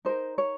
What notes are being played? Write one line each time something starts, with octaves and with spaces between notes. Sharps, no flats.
D#4 A#4 C5
C#5